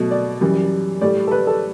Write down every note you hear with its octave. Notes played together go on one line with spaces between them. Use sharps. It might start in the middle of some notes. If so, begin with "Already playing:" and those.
Already playing: B2 F#3 A3
D5
F#2 E3 G3
A2 G3 D5
A4
B4
A4